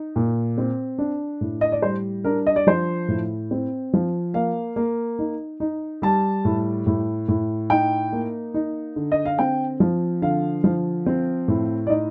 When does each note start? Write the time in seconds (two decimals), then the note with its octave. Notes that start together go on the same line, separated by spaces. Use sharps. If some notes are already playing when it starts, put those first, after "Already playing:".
Already playing: D#4
0.16 A#2
0.58 C4
0.98 D4
1.41 A2
1.61 D#5
1.72 D5
1.82 G3 C5
2.24 D4 A#4
2.47 D#5
2.56 D5
2.67 F3 C5
3.08 A2
3.51 C4
3.93 F3
4.34 A#3 F5
4.76 A#3
5.19 D#4
5.60 D#4
6.02 G3 A5
6.45 A2
6.87 A2
7.28 A2
7.70 D#4 G5
8.12 A#3
8.54 D#4
8.96 D3
9.12 D#5
9.25 F5
9.39 C4 G5
9.80 F3
10.22 D3 F5
10.64 F3
11.06 C4
11.48 A2
11.87 D5
11.90 D#4 D#5